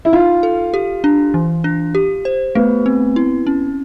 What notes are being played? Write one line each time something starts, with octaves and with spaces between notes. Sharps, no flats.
E4
D#4 F4
A4
G4
D4
E3
D4
G4
C5
A3 B3
C4
E4
C#4